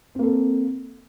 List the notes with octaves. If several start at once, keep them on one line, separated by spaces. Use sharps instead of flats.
A#3 C4 A4